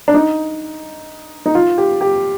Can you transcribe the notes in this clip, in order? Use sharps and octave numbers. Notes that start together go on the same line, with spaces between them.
D4
D#4
D#4
F4
G4
G4